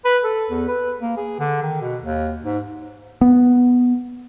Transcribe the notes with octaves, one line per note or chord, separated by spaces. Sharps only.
B4
A4
E2
B4
A#3
G#4
D3
D#3
B2
D#2
G#2
B3